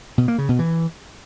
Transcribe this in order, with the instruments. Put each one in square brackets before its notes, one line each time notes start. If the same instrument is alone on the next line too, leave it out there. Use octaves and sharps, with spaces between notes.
[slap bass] B2
A#3
C#3
B2
E3